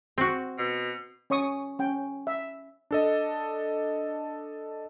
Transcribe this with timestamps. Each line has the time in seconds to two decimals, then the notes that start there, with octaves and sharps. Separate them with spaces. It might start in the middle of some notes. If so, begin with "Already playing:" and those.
0.18 C4 F#4
0.58 B2
1.30 C#4 C#5 C#6 D#6
1.79 C#4 G5
2.27 E5
2.91 D4 A4 D#5